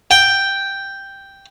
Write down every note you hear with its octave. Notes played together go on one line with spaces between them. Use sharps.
G5